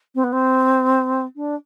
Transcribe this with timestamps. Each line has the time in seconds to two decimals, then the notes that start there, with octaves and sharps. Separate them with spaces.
0.15 C4
0.24 B3
0.33 C4
1.36 D4